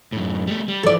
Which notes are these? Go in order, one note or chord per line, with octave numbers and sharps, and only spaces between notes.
F#2 A2
G3 A3
G3
E3 F3 A4 D5